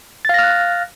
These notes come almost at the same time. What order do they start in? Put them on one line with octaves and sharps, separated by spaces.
A6 F5 A#6 F6 F#6